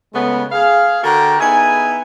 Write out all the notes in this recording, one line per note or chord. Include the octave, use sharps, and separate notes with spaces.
C#3 G#3 A3 B3
G#4 F5
D3 F#4 A4 A#4 G5 A#5
B3 D#4 E4 G#4 G#5